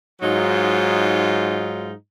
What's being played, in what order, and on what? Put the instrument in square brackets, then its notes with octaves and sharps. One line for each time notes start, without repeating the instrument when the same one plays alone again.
[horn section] G#2 F#3 D#4 F4